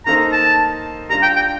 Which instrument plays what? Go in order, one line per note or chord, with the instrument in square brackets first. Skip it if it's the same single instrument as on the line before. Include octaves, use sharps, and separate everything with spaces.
[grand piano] D#3 A#3 D#4 A4 C5 [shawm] A#5
[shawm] A5
[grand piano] G3 D4 F4 [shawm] A#5
[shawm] G5
G5